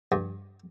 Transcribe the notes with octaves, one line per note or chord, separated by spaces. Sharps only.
G2